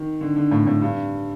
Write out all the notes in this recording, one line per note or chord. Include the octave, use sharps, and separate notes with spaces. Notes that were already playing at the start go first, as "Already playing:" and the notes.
Already playing: D#3
D3
D3
A2
A2
G2